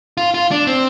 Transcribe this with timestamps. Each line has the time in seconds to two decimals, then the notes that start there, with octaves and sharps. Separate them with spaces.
0.17 F4
0.34 F4
0.51 D4
0.67 C4